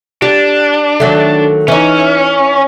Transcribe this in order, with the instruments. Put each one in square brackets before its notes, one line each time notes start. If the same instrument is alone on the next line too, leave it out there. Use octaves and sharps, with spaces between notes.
[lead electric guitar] D4 [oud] G4
[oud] D#3 F#3 A3
[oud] E3 D#4 [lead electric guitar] C#4